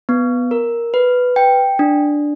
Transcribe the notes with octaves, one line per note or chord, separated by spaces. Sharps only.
B3
A#4
B4
G5
D4